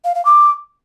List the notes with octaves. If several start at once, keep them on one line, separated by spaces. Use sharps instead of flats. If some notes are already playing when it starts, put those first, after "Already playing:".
F5
F5
D6